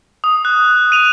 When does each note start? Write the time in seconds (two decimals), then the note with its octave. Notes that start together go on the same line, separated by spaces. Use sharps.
0.24 D#6
0.45 F#6
0.92 D#7 F7